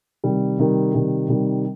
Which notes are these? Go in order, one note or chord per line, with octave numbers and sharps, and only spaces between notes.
C3 D#3 G3
C3 D#3 G3
C3 D#3 G3
C3 D#3 G3